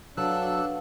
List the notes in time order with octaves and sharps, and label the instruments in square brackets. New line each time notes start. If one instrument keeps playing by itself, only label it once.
[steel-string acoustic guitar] F#3 [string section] D4 [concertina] A4 E6 F#6 [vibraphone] B4 F5 F#5